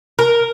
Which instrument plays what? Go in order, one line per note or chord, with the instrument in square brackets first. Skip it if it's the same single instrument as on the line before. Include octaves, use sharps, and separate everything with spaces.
[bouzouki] A#4